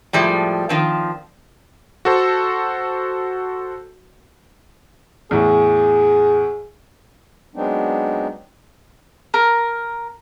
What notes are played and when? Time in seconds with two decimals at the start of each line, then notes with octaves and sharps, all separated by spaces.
0.13 A2 F3 G3 G#3
0.69 D#3 F3 C4
2.05 F#4 A4 C5
5.31 E2 A2 G#4
7.55 F#3 G#3 B3 C4 D4 D#4
9.34 A#4